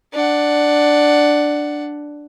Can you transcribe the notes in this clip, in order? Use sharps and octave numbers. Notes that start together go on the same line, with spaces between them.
D4 F#5